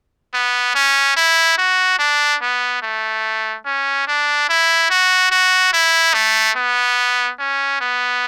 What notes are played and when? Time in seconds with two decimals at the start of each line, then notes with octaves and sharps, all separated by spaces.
0.34 B3
0.75 C#4
1.16 E4
1.58 F#4
1.99 D4
2.41 B3
2.82 A3
3.66 C#4
4.07 D4
4.49 E4
4.90 F#4
5.31 F#4
5.73 E4
6.14 A3
6.56 B3
7.39 C#4
7.81 B3